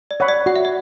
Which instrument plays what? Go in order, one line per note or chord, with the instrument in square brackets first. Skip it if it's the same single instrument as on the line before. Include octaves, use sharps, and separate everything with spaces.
[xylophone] D5
[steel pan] C#5 F#5 B5
[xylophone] D5
[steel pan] F#4 [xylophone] F#5
[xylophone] E5
D5